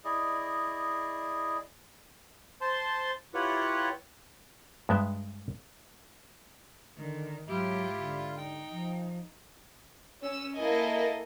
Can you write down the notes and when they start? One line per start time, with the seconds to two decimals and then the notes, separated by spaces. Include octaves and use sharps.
0.05 E4 G#4 D5 D#5
2.61 C5 A5 C6
3.34 E4 F4 G4 B4 C#5 F#5
4.89 G2 G#3 B3 E5 G5
6.97 D3 D#3
7.48 G#2 F#3 E4 F4 G4
7.97 D3
8.37 D#4 G5
8.70 F3
10.23 C#4 E6
10.57 A#3 E4 A4 D#5 G#5